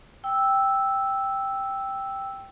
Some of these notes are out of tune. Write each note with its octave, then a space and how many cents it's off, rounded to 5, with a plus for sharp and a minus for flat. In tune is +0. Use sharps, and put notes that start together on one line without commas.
G5 +0 E6 +0